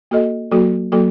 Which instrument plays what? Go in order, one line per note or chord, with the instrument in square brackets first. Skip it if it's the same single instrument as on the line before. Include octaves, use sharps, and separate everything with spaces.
[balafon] A#3 F#4 A4 D#5
F#3 A#3 F#4 A4
F#3 A#3 F#4 A4